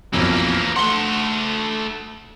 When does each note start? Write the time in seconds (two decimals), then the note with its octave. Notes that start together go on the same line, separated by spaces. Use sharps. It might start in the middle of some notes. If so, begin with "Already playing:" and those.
0.14 B1 F2 E3 A#3
0.76 A3 F#5 C6 G7